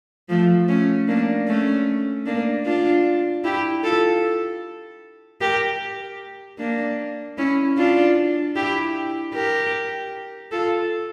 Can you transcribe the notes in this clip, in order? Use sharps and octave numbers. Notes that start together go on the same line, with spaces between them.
F3 A3
A3 C#4
A#3 D4
A3 C#4
A#3 D4
D4 F4
E4 G4
F4 A4
G4 A#4
A#3 D4
C#4 E4
D4 F4
E4 G4
G4 A#4
F4 A4